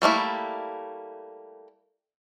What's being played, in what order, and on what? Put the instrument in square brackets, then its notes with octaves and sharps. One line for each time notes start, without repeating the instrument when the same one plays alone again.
[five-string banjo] G3 A3 A#3 E4